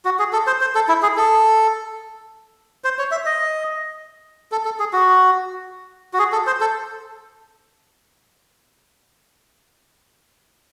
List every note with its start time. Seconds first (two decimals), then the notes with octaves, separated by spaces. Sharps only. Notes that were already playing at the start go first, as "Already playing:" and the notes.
0.05 F#4
0.19 G#4
0.33 A4
0.47 C5
0.61 C5
0.75 A4
0.89 E4
1.03 G#4
1.17 A4
2.84 C5
2.99 C#5
3.11 E5
3.26 D#5
4.52 A4
4.65 A4
4.80 G#4
4.93 F#4
6.13 F#4
6.19 G#4
6.32 A4
6.47 C5
6.61 A4